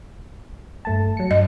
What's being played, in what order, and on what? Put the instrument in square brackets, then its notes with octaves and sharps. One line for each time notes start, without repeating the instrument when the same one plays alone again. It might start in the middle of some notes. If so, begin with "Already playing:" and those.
[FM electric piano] G2 A3 A5
F#3 C#7
[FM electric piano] G2 [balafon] D#5